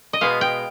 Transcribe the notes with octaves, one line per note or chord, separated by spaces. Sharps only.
D#5
B2 G#3 B3 F5
G5